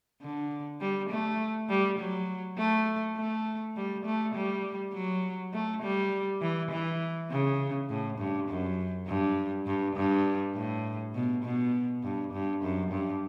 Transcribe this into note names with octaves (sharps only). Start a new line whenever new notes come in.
D3
G3
A3
G3
F#3
A3
A3
G3
A3
G3
F#3
A3
G3
E3
E3
C#3
A2
G2
F#2
G2
G2
G2
A2
B2
B2
G2
G2
F#2
G2